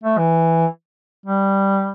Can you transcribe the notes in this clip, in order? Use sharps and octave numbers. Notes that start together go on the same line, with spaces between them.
A3
E3
G3